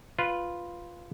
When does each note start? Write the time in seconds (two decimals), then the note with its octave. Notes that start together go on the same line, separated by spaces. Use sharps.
0.19 F4 B4